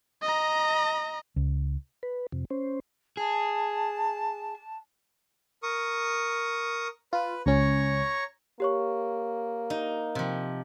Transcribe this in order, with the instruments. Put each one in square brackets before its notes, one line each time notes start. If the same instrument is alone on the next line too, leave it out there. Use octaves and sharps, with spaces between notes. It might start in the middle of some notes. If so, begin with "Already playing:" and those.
[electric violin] D#5 A#5
[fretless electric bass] C#2
[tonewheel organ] B4
F2 C3
C#4 C5
[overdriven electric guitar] G#4 [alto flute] A5
[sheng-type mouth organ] A#4 C#6 D#6
[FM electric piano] F4 [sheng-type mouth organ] B4
[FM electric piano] C#2 C#4 [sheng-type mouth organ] C#5 A#5 C#6
[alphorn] A#3 [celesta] G4 C#5 C#6
[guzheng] D#4
C3 F3